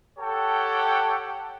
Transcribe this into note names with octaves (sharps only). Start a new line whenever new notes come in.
G4 A4 C#5 F#5 G5 A5